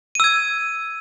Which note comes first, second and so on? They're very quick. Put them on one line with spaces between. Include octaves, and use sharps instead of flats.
D#7 E6 G#6